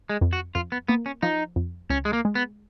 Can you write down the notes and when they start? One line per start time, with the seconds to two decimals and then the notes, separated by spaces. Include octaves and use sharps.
0.09 G#3
0.21 F2
0.33 F#4
0.55 F2 F4
0.72 B3
0.88 A#3 B3
1.06 C#4
1.22 F3 D#4
1.56 F2
1.90 C#2 C#4
2.05 G#3
2.13 A#3
2.25 G#3
2.35 B3